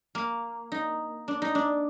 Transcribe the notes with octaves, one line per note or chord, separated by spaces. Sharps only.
A#3
D#4
D4
D#4
D4